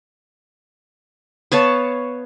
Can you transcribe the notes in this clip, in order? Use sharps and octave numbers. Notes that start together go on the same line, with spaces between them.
B3 C#5 F5 A5